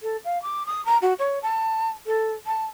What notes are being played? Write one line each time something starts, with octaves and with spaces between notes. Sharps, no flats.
A4
F5
D6
D#6
A#5
F#4
C#5
A5
A4
A5